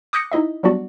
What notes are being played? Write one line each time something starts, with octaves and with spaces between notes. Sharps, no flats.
D6 D#6 F#6 G6 A#6 C#7
D#4 E4 D#5 E5
F#3 G3 B3 D4 F#4 D5